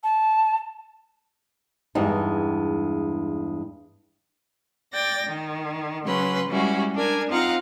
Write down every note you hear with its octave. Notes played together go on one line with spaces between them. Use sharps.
A5
E2 G2 G#3 D#4
D5 G5 A6 A#6
D#3
C#3 F#3 C#4 B4 C6
G3 G#3 C#4 E4 F#4
D4 A#4 G#5
C4 D#4 F4 F5 F#5 A#5